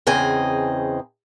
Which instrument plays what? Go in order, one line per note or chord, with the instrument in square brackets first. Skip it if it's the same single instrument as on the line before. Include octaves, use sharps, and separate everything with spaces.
[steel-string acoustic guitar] E2 C#3 C4 D#5 G#5